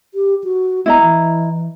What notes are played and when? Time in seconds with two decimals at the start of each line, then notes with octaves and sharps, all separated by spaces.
0.14 G4
0.44 F#4
0.86 B3 E4 D#5 A#5
1.02 E3